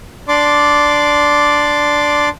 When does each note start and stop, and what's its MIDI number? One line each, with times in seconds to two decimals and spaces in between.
0.28 2.29 62
0.28 2.29 74
0.28 2.29 84
0.28 2.29 86